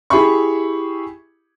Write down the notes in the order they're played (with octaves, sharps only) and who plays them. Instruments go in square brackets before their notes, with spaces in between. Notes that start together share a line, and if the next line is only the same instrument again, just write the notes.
[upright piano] E4 G4 G#4 E5 B5 C#6